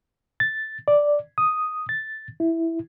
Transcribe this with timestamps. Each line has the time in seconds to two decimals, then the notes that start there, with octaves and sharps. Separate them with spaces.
0.40 A6
0.88 D5
1.38 D#6
1.89 A6
2.40 E4